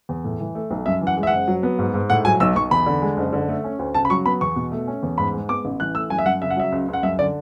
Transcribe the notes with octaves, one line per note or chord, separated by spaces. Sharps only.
E2
A2
E3
A3
B1
F#2 E5
E3
F#5
G#3
E5
F#5
F#1
F#3
B3
G#2
G#2
A2 F#5
F#3 G#5
B1 E6
B1 C#6
E2 B5
D3
G#3
F#1
D3
A3
C#4
D2
C#3 A5
B5
F#3 C#6
B3 B5
E2 C#6
B2
A3
C#4
E2
G#2 B5
G#3
B3 D6
A1
E3 F#6
A3 E6
F#2 G#5
E5
F#2 F#5
C#3 E5
F#5
F#3 E5
C#2
C#2
F#5
F#2 E5
D3 D5